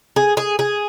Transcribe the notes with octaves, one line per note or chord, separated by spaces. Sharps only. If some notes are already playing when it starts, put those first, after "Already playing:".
G#4
G#4
G#4